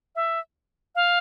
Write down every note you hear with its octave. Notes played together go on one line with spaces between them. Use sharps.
E5
F5